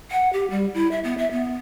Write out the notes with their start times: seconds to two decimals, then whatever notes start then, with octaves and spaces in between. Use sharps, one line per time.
0.11 F#5
0.33 G4
0.51 G3
0.74 E4
0.91 E5
1.04 B3
1.18 E5
1.32 B3